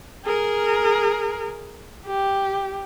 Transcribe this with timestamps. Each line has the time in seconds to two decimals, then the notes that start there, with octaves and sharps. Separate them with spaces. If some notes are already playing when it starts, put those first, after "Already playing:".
0.25 G#4 A#4
2.07 G4